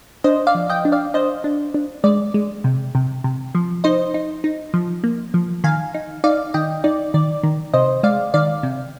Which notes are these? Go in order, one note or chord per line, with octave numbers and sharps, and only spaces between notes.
D4 C5 D#5
D5 F5
F3
D#5 G5
D4
D5 F5
D4 C5 D#5
D4
D4
G#3 D5
G#3
C3
C3
C3
F3
D#4 C5 D#5
D#4
D#4
F3
A#3
F3
D#3 F5 G#5
D#4
D#4 D5 F5
D#3 D#5 G5
D#4 D5
D#3 D5
D#3
C3 C5 D#5
G#3 D5 F5
D#3 D5 F5
C3